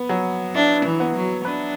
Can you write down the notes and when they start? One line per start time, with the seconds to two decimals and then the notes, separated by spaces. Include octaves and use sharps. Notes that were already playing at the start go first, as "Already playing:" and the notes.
Already playing: B3
0.09 F#3
0.55 D4 E4
0.86 E3
1.00 B3
1.15 F#3
1.45 D4 B4